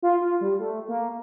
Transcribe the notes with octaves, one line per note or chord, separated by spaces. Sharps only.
F4
F4
G3
A3
A#3